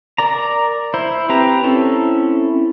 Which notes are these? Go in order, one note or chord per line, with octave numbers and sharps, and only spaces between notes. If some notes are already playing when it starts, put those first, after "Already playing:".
A#4 D5 A#5
E4 C5
C4 G4 B4 A#5
C4 C#4 E4 A4